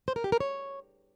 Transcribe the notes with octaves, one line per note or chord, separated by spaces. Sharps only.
C5
A#4
G4
A#4
C#5